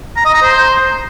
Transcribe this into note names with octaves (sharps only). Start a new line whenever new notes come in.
A#5
D#5
A#5
C5